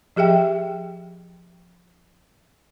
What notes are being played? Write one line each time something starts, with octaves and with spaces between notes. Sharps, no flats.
F3 G4 G#4 E5 G5